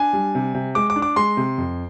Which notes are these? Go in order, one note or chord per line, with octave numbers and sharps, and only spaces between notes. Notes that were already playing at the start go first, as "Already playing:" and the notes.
Already playing: D4 G#5
G3
C3
C3
G#3 D6
D6
D4
D6
G#3 C6
C3
F2